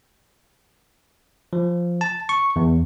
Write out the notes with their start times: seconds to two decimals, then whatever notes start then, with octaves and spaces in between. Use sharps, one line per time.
1.53 F3
2.01 A5
2.29 C#6
2.56 E2